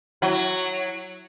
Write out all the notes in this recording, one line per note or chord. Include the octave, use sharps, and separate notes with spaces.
F#3 E4